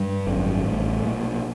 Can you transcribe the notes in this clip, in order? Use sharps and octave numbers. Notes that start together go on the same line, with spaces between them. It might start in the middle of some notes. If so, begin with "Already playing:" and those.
Already playing: G2 G3
G#1 F#2 D3
A1 A2
B1 A#2